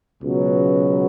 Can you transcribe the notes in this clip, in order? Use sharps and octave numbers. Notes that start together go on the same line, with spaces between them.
C#2 B2 F#3 B3